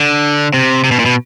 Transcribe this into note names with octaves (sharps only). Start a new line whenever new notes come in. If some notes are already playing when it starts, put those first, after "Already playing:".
Already playing: D3
C3
C3
B2
A#2
B2